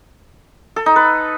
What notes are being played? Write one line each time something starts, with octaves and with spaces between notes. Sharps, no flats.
A4
D#4
B4